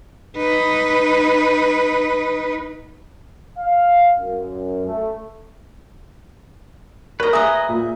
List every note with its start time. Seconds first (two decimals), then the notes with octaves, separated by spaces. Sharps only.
0.37 D#4 B4
3.57 F5
4.17 F#2
4.85 A3
7.20 A#4 B4 C#5 D#5 A#5
7.33 G#4 E5 G#5 A#5 D#6
7.69 A#2